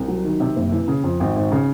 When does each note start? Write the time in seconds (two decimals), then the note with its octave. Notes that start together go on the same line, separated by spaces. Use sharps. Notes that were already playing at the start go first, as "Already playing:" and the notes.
Already playing: C2
0.08 F#3
0.24 D#3
0.40 C3
0.56 F#1
0.72 E3
0.88 C#3
1.03 F2
1.20 G#1
1.36 G#1
1.52 C#3